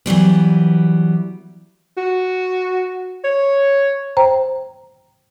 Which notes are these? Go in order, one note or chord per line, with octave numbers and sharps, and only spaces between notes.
E3 F#3 G3 B3
F#4
C#5
C5 G5 A#5